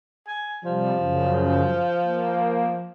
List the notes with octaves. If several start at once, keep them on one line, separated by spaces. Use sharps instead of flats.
G#5
C3 F3 G3
F#2 C#3
A#3